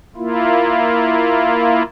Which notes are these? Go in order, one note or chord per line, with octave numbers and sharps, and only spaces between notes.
A#3 E4 F4